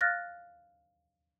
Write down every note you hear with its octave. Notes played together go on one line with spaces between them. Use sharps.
F5 F6 F#6 A6 A#6